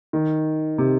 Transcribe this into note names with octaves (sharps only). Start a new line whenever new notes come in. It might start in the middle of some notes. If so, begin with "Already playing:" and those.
D#3
C3